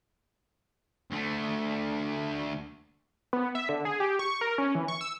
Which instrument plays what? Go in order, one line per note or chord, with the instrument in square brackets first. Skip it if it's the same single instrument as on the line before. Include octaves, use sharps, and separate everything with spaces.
[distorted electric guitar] D2 A3
[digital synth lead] B3
E5
D3
G#4
G4
C#6
A#4
C#4
E3
C#6
E6